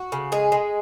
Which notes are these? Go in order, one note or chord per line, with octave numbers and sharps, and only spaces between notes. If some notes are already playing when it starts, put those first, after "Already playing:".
Already playing: F#4
C#3
G#3 G#4
G#3